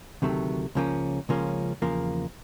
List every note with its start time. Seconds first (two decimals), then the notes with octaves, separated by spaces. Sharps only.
0.22 D2 C3 D#3 F#3 A3
0.75 C#2 C#3 F3 A#3 C#4
1.29 C#2 C#3 F3 A#3 C#4
1.82 E2 C#3 F3 A#3